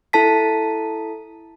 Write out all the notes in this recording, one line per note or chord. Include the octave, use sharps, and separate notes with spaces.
E4 A4 A5 B6